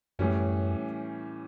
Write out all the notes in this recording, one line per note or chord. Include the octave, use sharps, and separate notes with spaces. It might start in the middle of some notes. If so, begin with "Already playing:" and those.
F#2 A2 E3 G3 C#4